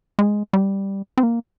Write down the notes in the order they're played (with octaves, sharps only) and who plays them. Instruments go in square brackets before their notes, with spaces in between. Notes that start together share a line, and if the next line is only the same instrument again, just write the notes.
[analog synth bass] G#3
G3
C4
A#3